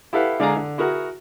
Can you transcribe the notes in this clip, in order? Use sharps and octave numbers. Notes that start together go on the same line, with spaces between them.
E4 G4 A4 B4 F5 F#5
D3 G#3 D5 F5 G#5 A#5
D3
E4 F#4 G#4 A#4 F#5